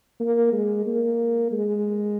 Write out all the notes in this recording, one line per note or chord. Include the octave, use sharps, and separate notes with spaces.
A#3
G#3
A#3
G#3